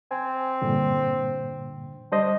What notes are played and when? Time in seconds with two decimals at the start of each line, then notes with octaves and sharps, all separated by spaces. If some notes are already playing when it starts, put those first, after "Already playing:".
0.11 C4 G#5
0.62 G2 A#2 D3
2.12 G3 D4 C5 D#5